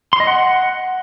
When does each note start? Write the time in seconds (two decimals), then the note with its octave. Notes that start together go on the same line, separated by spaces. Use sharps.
0.13 C6
0.20 D#5
0.27 F#5